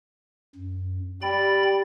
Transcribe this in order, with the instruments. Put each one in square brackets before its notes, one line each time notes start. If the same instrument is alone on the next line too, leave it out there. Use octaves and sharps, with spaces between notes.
[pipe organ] F#2
[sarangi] G3 [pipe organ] G5 B5 A6